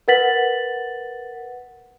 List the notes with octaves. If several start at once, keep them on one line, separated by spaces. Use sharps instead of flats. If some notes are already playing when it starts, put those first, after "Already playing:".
A#4 B4 F#5 A6 B6 F#7